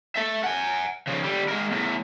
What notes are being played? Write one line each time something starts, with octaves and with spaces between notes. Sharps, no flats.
A4 E5
F#5 G#5
C#3 F3
D3 G3
G#3 A#4
E2 A2